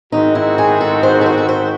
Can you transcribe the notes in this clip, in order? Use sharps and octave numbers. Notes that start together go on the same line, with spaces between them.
G#2 D#3 G#3 C4 D#4 F#4
E4
G#4
A4
C5
A4
C5
A4
C5